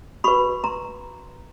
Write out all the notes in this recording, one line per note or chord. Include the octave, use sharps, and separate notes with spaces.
F#4 B4 B5 C#6
A#5 C6